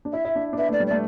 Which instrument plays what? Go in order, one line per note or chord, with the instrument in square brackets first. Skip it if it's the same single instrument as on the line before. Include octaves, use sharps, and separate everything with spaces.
[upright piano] D4
[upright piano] E4 [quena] E5
[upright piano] E4
D4
D4
[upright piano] B3 [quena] E5
[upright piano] A3 [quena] D5
[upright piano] G3
[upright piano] A3 [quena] D5